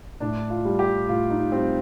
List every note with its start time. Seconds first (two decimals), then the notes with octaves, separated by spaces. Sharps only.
0.20 A2 D4
0.50 F4
0.65 G3
0.79 G4
1.09 A2 F4
1.30 D#4
1.52 G3 C4